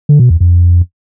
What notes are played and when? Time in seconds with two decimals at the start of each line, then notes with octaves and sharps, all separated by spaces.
0.09 D3
0.19 B2
0.30 E2
0.41 F2